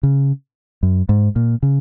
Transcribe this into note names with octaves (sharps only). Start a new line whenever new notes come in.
C#3
F#2
G#2
A#2
C#3